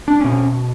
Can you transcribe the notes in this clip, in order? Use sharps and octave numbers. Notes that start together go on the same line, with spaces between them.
D4
B2 C#4